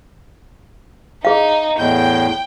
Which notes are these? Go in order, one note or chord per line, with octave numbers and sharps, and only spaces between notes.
D#4 G#4 F5
E2 A2 G5 G6